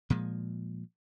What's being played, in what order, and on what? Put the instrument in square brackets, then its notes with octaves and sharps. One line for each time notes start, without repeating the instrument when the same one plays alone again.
[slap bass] A#2 F3 G#3